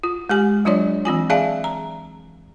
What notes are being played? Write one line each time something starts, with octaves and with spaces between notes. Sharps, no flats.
F4
G#3 G4 G#5
F#3 D4 F4 C#5 D5
E3 C4 F4 G#5
G#4 D5 E5 F5 G#5 A5
A#5